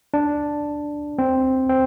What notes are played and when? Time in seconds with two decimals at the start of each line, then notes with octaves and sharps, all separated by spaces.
0.14 D4
1.18 C4
1.69 C4